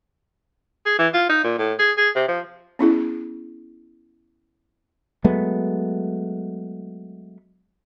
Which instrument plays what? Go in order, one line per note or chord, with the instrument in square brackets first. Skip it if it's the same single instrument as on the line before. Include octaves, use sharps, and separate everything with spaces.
[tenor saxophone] G#4
E3
F4
D#4
A#2
A2
G#4
G#4
C3
F3
[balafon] B3 C#4 E4 G#4
[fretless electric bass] F#3 G#3 A3 B3